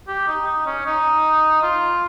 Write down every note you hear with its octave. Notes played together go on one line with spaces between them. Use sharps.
G4
D#4
D#4
C#4
D#4
F4